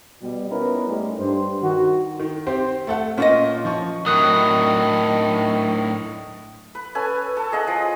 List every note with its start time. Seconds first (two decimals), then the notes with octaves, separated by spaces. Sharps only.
0.22 B2 G3
0.50 B3 C#4 D#4 E4 A#4 B4
0.88 A2 G3 G#3
1.18 G2 C5
1.62 D#3 F#4
2.19 D#3
2.46 C4 G4 C5
2.87 A3 A4 F#5
3.17 A#2 C#4 F4 D#5
3.65 F3 C#6
4.06 A2 D#3 F#3 D#6 F#6
6.75 B4
6.95 C#4 A4 B4 G#5
7.37 A4 A5
7.52 G#4 D#5 F#5
7.67 F3 G#5